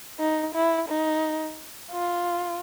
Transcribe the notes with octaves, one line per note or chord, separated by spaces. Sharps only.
D#4
E4
D#4
F4